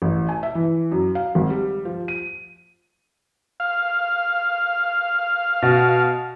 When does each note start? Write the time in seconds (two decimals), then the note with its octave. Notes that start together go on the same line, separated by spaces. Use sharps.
0.02 A1
0.29 G#5
0.43 E5
0.55 E3
0.92 F#2
1.15 F5
1.35 G#1
1.50 G3
1.85 F3
2.08 D#7
3.60 F5
5.62 B2